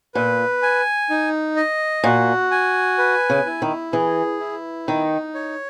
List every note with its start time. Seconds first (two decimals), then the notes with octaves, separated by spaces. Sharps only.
0.15 A#2 B4
0.62 G#5
1.10 D#4
1.56 D#5
2.04 A#2 F#4
2.51 G#5
2.98 B4
3.30 C#3
3.46 E4
3.62 D#3
3.93 E3 G#4
4.40 E4
4.87 D#3 D#4
5.35 C#5